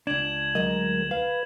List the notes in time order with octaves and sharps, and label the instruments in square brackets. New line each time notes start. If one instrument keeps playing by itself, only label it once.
[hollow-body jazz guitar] C#2 D4 [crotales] G#6 E7 F#7
[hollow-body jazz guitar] D2 D#5 [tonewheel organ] F#3 G#3 A#4
[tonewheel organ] B4 [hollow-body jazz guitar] F5